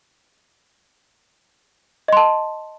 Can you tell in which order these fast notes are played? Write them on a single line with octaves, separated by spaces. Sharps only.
D#5 C6 A5